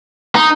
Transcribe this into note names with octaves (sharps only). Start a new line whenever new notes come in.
D#4